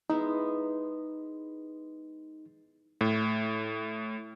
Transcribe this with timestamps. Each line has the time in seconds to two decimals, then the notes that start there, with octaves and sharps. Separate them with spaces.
0.10 G#3 B3 D#4 E4
3.01 A2